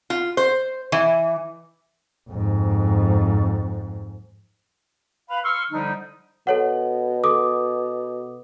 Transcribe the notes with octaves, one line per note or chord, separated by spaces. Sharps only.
F4
C5
E3
F2 G#2
B4 F5 B5
C6 C#6 E6 F6
D3 F3 G3 D4 D#4
B2 A4 C#5 F#5
A4 D6 D#6